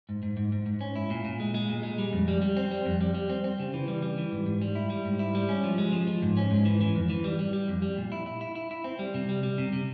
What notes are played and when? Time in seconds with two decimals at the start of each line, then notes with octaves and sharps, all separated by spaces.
0.09 G#2
0.23 G#2
0.37 G#2
0.52 G#2
0.66 G#2
0.81 C#4
0.96 E4
1.10 A#2
1.25 A#2
1.40 G#3
1.54 G#3
1.69 A#2
1.83 G#3
1.98 G3
2.13 F2
2.28 G3
2.42 G3
2.57 C4
2.71 G3
2.85 F2
3.01 G3
3.14 G3
3.30 C4
3.44 C4
3.59 C#3
3.74 E3
3.88 G3
4.02 G3
4.18 E3
4.32 G#2
4.46 G#2
4.61 G3
4.75 E4
4.90 G3
5.05 G#2
5.19 E4
5.35 G3
5.49 C#4
5.64 F3
5.78 G#3
5.93 F3
6.07 F3
6.22 G#2
6.37 C#4
6.51 G#2
6.65 E3
6.81 E3
6.95 F2
7.10 E3
7.24 G3
7.39 G3
7.53 G3
7.68 F2
7.82 G3
7.97 A#2
8.12 E4
8.26 E4
8.41 E4
8.56 E4
8.71 E4
8.84 C4
8.99 G3
9.14 C3
9.29 G3
9.43 G3
9.58 C3
9.73 C3